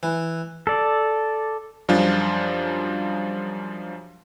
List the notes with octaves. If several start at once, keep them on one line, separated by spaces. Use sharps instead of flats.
E3
A4 D5
F#2 F3 G3 D4 F4